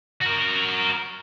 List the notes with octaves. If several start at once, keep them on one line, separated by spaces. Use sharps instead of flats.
F#4 A#4